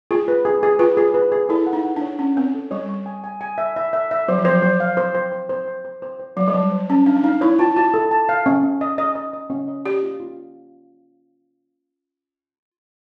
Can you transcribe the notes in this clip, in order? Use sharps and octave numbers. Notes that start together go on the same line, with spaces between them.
F4 G#4
B4
G#4
G#4
F4 B4
G#4
B4
G#4
E4 A4
F#5
D#4
F#5
D4
C#5
C#4 F#5
C4 C#5
A4
G3 C#5
C#6
G#5
G#5
G#5
E5
E5
E5
E5
F#3 C5
F3
F#3 C5
F#3 C5
F5
C5
C5
C5
C5
C5
C5
C5
C5
F#3 C5
G3
F#3 A5
C5
C#4 A5
D4 F5
D4
D#4 F5
E4 C#5
F4 A5
F#4 A5
A4
A5
F5
C#4
C#4
D#5
D#5
D#5
D#5
C#4
D#5
G4 D5
F4
F4